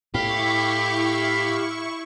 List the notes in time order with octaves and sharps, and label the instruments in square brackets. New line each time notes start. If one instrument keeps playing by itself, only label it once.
[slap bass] A2 [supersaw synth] E4 C#6 [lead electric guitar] G4 [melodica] F5 B5